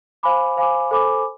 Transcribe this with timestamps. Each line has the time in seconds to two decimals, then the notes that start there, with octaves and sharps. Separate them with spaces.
0.23 C5 F5 G#5 B5 D6
0.57 C5 F5 G#5 B5 D6
0.91 A4 C5 G#5 B5 D6